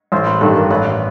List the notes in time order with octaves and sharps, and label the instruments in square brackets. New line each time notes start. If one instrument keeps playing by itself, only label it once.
[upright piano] A1 [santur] C5
[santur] B4
[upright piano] G2 D#3 G3 [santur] A4
[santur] A#4
[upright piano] A1 [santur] B4